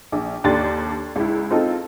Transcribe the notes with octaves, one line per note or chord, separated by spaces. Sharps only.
A#1
D#2 D4 G4 A4 C6 A6
C#2 E4
C4 D#4 F4 A4